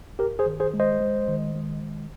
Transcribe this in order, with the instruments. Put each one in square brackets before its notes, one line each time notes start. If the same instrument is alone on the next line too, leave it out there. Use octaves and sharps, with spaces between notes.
[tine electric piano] G2 G4 A#4
G#4 C5
D#3
G#4 C5
G#3
C5 D#5
G#3
D#3
G#3
D#3